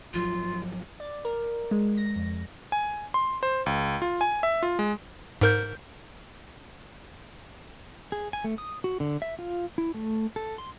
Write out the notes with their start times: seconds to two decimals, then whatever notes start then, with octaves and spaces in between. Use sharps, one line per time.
0.14 G#1 F3 F#3 F4
1.00 D5
1.25 A#4
1.71 G#3
1.97 A#6
2.16 F2
2.72 G#5
3.14 C6
3.43 C5
3.66 C#2
4.02 F4
4.21 G#5
4.43 E5
4.63 F4
4.79 G#3
5.41 G#2 A#4 G6
8.12 G#4
8.33 G#5
8.44 A3
8.58 D#6
8.84 F#4
9.00 D3
9.22 E5
9.39 F4
9.78 E4
9.94 A3
10.36 A4
10.58 C6